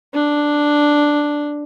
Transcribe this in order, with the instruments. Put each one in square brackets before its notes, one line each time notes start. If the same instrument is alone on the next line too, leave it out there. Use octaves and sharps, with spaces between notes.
[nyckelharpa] D4